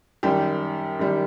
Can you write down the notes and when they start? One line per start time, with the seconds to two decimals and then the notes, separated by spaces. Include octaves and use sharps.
0.23 F#2 D#3 G3 G4
0.99 F#2 D#3 G3